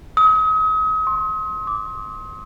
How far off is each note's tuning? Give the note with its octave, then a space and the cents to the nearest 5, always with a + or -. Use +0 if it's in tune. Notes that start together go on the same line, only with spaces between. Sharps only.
D#6 +40
C6 +25
D6 -10